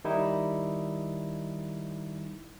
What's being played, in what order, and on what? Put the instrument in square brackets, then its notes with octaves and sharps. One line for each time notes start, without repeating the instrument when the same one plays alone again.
[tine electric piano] D#3 G3 D#4 E4